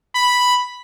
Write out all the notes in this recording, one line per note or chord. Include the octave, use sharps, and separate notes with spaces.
B5